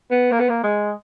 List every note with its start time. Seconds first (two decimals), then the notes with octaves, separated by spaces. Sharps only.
0.11 B3
0.32 A#3
0.40 B3
0.49 A#3
0.63 G#3